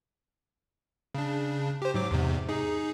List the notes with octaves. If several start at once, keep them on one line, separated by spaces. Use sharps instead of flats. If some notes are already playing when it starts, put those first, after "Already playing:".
C#3 D4
G4 C5
G#2 F#3 D6
E2 G#2 C3
D#4 G#4